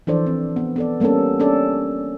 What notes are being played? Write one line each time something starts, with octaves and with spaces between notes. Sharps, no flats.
E3 F3 D4 A4 C5 D5
C4
B3
B3 A4 D5
G3 A#3 B3 C#4 A4
C#4 D4 A4 D5